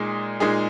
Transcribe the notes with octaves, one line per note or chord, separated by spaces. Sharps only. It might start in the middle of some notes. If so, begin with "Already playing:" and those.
Already playing: A#2 G#3 D#4 G#4
A#2 G#3 D#4 G#4